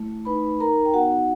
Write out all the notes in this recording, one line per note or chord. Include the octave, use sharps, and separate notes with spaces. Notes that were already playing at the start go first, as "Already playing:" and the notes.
Already playing: A3 E4
D#4 B4 B5
D#4 A#4 A#5
G5
B3 F#4 F#5